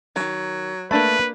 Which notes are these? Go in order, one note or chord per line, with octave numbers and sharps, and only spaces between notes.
D#3 F3 F#3
A3 A#3 D4 B4 A5 B5